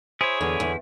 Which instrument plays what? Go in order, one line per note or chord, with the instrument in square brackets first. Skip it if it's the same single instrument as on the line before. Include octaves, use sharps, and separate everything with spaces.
[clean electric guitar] E4 [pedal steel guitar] G#4 C#5 [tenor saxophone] C5
[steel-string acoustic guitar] E2 [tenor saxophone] D3
[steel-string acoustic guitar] E2